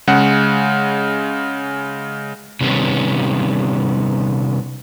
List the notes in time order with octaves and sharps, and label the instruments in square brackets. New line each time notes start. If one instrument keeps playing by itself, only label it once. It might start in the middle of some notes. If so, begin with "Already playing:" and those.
[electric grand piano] C#3 G#3 F#5
[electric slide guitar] C3 D#3 G3 B3 C#4